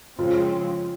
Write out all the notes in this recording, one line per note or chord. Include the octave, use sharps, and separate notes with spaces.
C#3 F3 G#3 C4 F4